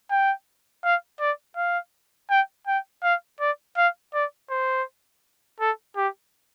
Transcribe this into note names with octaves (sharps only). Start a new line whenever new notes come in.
G5
F5
D5
F5
G5
G5
F5
D5
F5
D5
C5
A4
G4